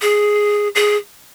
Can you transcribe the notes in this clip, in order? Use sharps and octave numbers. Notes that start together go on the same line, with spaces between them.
G#4
G#4